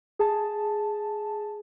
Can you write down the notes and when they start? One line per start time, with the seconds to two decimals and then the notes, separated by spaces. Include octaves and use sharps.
0.19 G#4 A5